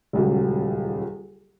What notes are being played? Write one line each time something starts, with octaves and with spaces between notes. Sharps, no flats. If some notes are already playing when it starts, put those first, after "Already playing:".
D#1 C#2 F#3